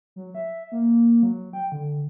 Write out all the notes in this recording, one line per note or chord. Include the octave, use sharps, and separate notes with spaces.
F#3
E5
A#3
F#3
G5
D3